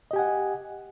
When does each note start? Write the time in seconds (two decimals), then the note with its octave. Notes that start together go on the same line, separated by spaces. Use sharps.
0.11 D#5
0.13 G4
0.16 G#5
0.19 F#5